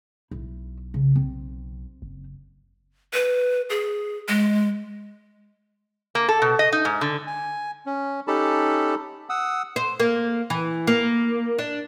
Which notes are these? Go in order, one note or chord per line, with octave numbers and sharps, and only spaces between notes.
B1 E4
C#3
C4
F#1
B4
G#4
G#3
A#3
A4
B2
D#5
D#4
G#2
D3
G#5
C#4
C#4 D#4 G4 A4 A5 B5
F#5 D#6 E6
C5
A#3
E3
A#3
D4